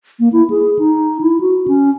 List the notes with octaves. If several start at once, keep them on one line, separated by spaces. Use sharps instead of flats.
A#3
E4
G#4
D#4
E4
F#4
C#4